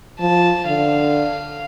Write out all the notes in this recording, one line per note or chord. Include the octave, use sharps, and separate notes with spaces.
F3 A5
D3 F5